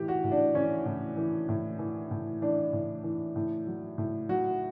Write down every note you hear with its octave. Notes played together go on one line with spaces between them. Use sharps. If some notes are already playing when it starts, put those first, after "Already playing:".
Already playing: A2 E3 G4
F#4
A2
D4
E3 C#4
A2
E3
A2
E3
A2
E3 D4
A2
E3
A2
F#3
A2
F#3 F#4